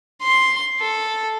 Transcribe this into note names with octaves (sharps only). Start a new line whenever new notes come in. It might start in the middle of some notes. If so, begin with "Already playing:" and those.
C6
A4